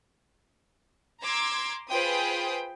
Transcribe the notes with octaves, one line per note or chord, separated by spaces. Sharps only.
A#5 C6 D6 E6 G#6
F4 G#4 B4 C5 G5 D#6